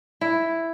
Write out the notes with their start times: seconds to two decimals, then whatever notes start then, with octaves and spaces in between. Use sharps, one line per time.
0.21 E4